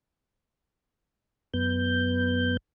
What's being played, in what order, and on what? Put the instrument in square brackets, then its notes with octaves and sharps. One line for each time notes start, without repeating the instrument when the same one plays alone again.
[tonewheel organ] F#2 B3 G6